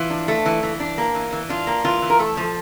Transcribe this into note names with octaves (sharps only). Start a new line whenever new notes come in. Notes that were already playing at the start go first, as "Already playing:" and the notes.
Already playing: E3 F4
D4
A3
E3
E3
D4
A#3
E3
E3
D4 F4
A#3
E3 F4
E3
A#4
A3 A4
F3